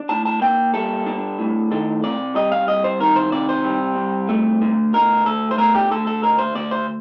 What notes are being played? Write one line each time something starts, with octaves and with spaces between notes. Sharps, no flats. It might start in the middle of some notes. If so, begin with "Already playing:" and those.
Already playing: D4
A2 A5
A5
A#3 G5
G3 A4
D4
A2
D#3 A4
C3 D5
G3 D#5
F5
C2 D#5
C5
D#3 A#4
C5
C3 D5
C5
G3
C2
A3
D3
D2 A#4
D2 A4
C5
A3 A#4
G4
D3 A4
A4
D2 A#4
C5
D2 D5
C5